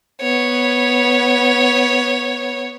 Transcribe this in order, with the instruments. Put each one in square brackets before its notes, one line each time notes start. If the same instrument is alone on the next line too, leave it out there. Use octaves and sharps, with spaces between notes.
[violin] B3 C#5